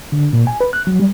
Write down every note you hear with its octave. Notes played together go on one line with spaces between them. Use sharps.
D3
A#2
G#5
B4
F#6
F#3
G3